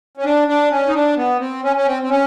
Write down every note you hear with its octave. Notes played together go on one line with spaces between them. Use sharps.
C#4
D4
D4
C#4
D#4
D4
B3
C4
C#4
C#4
C4
C4
C#4